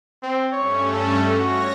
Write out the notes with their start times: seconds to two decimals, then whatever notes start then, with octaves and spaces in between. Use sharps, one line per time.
0.23 C4
0.53 G2 A3 C#4 C#5
0.93 A4
1.39 F#4 C#5 A#6